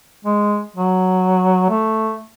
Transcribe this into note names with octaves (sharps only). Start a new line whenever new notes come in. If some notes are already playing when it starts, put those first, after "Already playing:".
G#3
F#3
A3